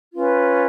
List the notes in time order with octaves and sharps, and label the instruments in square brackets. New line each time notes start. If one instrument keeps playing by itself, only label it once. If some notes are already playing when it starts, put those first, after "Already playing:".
[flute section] C#4 F4 B4